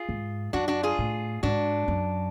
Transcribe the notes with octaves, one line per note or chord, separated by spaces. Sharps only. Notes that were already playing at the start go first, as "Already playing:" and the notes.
Already playing: F4 G#4
G#2
F#2 D4 F#4
D4 F#4
F4 G#4
A2
G#2 D4 F#4
F#2